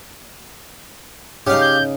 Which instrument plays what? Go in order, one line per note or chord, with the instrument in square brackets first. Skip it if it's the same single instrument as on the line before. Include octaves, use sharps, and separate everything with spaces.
[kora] C#3 D#4 [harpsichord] G4 F5
[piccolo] G6